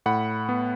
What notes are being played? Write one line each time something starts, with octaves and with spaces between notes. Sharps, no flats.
A2 F#5 B5
B3